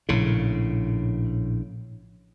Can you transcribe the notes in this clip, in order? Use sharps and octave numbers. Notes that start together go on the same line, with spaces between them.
A#1 A2 C#3